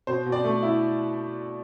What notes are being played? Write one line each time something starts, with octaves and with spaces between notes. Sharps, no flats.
B2 C5
B2
D5
A3
E4